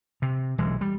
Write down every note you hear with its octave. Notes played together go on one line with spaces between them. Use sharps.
C3
B1 E3 G#3
G3